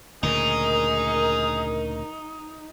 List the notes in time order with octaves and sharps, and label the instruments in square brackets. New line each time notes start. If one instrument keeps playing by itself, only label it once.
[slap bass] D2 A#2 C#3 [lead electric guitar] D#4 [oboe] G#4 [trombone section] A#4